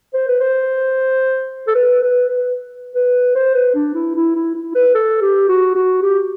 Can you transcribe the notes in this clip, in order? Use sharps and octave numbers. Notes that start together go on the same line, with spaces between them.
C5
B4
C5
A4
B4
B4
B4
B4
C5
B4
D4
E4
E4
E4
E4
B4
A4
G4
F#4
F#4
G4